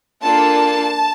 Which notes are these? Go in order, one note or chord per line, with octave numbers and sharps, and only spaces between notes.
A#3 D4 F4 A4 A5